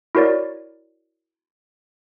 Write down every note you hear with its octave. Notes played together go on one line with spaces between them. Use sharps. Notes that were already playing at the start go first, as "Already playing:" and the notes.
E4 F#4 A#4 C#5 D5